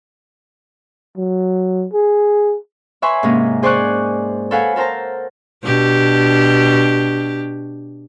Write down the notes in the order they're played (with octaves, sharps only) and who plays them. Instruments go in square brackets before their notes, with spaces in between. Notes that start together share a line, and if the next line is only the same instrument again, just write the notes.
[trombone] F#3
G#4
[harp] B4 C#5 E5 G#5 C6 C#6
G#2 C3 A#3 C#4 A#4
G#4 C5 D5 G#5 C#6 F#6
A4 B4 C#5 F5 F#5 G#5
A4 A#4 C5 A5 A#5
[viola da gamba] B2 D4 G4